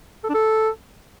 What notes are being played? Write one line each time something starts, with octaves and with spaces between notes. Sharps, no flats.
A4
D4
A4